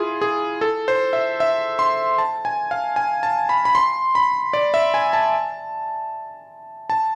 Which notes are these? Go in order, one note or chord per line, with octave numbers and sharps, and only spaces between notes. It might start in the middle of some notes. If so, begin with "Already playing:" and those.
Already playing: E4 F4 G#4
G#4
A4
C5
E5
E5
C6
A5
G#5
F5
G#5
A5
B5
B5
C6
B5
D5
E5
G#5
A5
A5